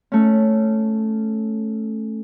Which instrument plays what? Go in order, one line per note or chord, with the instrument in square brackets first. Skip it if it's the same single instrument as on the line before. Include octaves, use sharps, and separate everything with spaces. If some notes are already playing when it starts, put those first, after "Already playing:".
[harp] A3 C#4